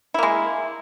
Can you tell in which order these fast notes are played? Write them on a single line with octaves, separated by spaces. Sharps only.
E4 A#3 G#3